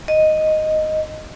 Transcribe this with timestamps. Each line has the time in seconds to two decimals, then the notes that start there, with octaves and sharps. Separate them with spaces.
0.08 D#5